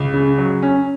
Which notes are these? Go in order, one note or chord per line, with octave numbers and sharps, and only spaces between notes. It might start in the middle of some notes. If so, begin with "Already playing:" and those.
Already playing: C#2
C#3
F#3
C#4